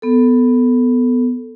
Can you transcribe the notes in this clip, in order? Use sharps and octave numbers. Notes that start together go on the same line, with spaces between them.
B3 A4